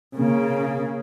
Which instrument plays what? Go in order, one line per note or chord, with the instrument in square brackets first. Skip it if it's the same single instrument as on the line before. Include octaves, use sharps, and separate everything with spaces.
[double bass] C#3 A#3